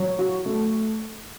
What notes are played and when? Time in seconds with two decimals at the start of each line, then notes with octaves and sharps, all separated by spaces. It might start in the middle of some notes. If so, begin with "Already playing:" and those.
Already playing: F#3
0.19 F#4
0.46 A3